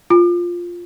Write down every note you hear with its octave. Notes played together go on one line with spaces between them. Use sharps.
F4